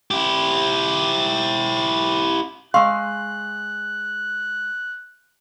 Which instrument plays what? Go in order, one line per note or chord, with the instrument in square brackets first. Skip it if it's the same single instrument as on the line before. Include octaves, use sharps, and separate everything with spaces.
[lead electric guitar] E4 G4
[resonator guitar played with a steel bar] G#3 F5 [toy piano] C6 C#6 E6 [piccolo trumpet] F#6